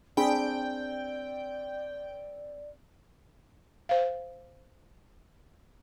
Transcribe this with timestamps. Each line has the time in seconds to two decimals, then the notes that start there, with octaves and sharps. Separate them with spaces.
0.17 C4 D4 G#4 D5 G5 B5
3.89 C5 F5